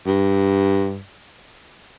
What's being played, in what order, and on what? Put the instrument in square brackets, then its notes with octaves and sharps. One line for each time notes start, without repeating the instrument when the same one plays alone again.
[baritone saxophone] G2